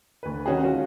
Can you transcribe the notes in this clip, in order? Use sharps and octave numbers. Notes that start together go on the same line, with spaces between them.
D2 B4
C3 D#3 C#4 F#4 G#4
G#3 C#4 F4 F#4